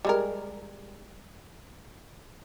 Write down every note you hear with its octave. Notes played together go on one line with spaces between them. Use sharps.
G3 G#3 A#4